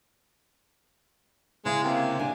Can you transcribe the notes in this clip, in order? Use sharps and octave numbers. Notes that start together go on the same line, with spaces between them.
C#3 G#3 E4
C3 A#3 C4
D4 G#5